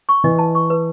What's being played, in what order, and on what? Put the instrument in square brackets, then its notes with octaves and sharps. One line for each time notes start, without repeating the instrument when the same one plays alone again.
[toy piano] C#6
[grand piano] E3 [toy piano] D#5
[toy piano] A5
C#6
B4